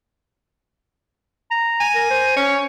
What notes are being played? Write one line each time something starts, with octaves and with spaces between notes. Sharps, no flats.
A#5
G#5
A#4
C5
C#4 C#5